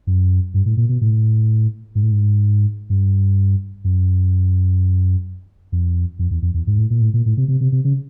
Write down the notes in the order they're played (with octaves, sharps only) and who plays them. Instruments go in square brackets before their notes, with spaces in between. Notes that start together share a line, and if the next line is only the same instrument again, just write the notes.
[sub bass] F#2
G2
A2
A#2
B2
A2
G#2
A2
G#2
G2
F#2
F2
F2
E2
F2
E2
G#2
A2
A#2
A2
A#2
A2
C3
C3
C3
C3
C#3